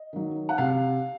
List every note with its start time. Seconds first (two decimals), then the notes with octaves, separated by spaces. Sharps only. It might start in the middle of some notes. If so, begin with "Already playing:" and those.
Already playing: D#5
0.13 D#3 F#3
0.49 F#5
0.58 C3 F5